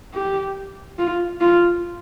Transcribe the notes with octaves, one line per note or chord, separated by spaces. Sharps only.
G4
F4
F4